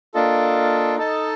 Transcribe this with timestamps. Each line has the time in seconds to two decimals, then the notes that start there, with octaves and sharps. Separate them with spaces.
0.14 A#3 D4 F4 A4 D#5
0.97 D#4 A4 D#5 A5